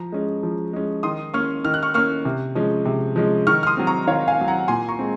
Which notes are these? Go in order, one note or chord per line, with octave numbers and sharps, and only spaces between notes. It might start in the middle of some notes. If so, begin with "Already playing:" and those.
Already playing: F3 A#5
G#3 C#4
F3
G#3 C#4
D#3 C6 D#6
A#3 C#4 C#6 F6
D#3 F6
F#6
C#6 F6
A#3 C#4 C#6 F6
C3
F3 G#3 C#4
C3
F3 G#3 C#4
D#3 C#6 F6
F6
C6 D#6
F#3 C4
A#5 C#6
D#3 C#5 F5
F5 G#5
F#3 C4
F#5 A#5
A#2 G#5 C6
A#5 C#6
G#3 C4